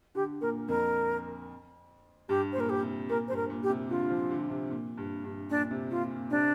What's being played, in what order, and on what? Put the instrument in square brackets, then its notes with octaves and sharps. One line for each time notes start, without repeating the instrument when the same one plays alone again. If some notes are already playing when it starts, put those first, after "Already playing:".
[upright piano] D3 [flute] G4
[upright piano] A#2 [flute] A#4
[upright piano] F2 [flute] A#4
[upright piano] G2 [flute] G4
[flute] C5
[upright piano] A#2
[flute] A#4
G4
[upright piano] C3
[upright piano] A#2 [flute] A#4
[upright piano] G2 [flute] C5
[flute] A#4
[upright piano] A#2
[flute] G4
[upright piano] C3
[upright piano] D3 [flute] F4
[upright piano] F3
D3
C3
A#2
G2
G2
[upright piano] A#2 [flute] D4
[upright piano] C3
[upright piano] A#2 [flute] F4
[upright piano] A#2
[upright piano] C3 [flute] D4